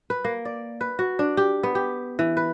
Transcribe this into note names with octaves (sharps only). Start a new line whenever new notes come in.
B4
A#3
D5
B4
F#4
D4
G4
B3
G4
E3
B4